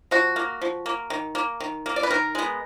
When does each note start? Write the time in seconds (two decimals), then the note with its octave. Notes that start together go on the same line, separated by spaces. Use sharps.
0.11 F3 F#4
0.36 A#3
0.62 F3
0.86 A#3
1.10 D#3
1.35 A#3
1.60 D#3
1.86 A#3
1.96 D5
2.03 B4
2.10 D#3 A#4
2.35 G#3 B3